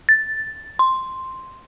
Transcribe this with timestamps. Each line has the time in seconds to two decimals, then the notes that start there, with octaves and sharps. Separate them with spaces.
0.09 A6
0.79 C6